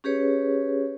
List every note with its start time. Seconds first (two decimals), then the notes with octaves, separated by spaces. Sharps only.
0.04 C#4 G4 G#4 B4 C#5